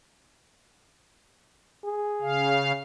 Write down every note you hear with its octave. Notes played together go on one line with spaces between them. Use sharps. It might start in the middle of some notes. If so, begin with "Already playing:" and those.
G#4
C#3 F5